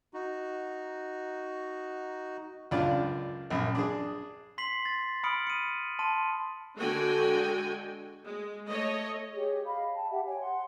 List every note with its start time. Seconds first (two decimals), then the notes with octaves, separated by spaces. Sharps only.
0.14 D#4 F#4
2.71 C#2 F#2 D4 F4 D5
3.50 A#1 F#2
3.75 D4 G#4
4.58 C6 B6 C7 F#7
4.85 A6
5.24 B5 D#6 F6 C#7 D7 F#7
5.47 C#7 D#7
5.99 A5 C6 D#7
6.78 D3 G#3 F#4 G5 G#5
8.25 G#3
8.69 A3 C#5 D#5
9.33 G4 G#4 C#5
9.65 D#5 F5 B5
9.96 G5 A5
10.11 G4 E5 F#5
10.26 C#5 G5 G#5
10.39 F#5 C6